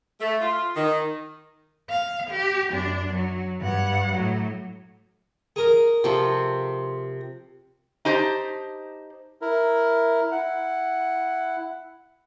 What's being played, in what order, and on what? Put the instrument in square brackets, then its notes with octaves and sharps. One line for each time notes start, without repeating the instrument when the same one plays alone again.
[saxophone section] A3
F4
D#3
[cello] F5
G4
F#2 D4
F#3
G2 F#5
A2 F#3
[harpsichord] G#4 A#4
[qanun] C3 F3 A4
[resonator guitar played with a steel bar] D#4 G4 C5 A5
[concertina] E4 A#4
E4 F#5